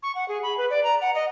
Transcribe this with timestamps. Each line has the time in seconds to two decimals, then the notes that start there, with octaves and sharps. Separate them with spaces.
0.03 C#6
0.15 F#5
0.28 G#4
0.43 B5
0.58 B4
0.70 D5
0.84 A#5
1.01 F#5
1.15 D#5